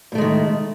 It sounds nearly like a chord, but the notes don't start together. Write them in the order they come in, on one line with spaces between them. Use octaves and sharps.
A2 A3 G#3 D#3